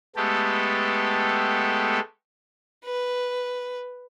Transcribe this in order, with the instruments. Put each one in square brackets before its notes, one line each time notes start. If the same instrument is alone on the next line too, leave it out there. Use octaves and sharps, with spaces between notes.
[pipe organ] G#3 A3 B3 G4 A4
[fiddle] B4